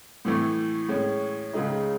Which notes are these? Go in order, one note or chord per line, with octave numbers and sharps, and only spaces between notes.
A2 E3 A3
A2 G#3 C#4
C#2 C#3 G#3 D#4